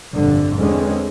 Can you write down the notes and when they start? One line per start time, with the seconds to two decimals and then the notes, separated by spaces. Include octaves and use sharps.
0.13 G1 F2 A#2 D3
0.55 E2 D3 G#3 C4 C#4